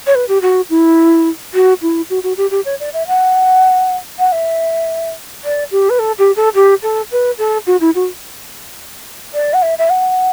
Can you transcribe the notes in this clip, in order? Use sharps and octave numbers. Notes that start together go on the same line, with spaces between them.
C#5
B4
G4
F#4
E4
F#4
E4
F#4
F#4
G4
G4
C#5
D5
E5
F#5
F#5
E5
D5
G4
B4
A4
G4
A4
G4
A4
B4
A4
F#4
E4
F#4
D5
F#5
E5
E5
F#5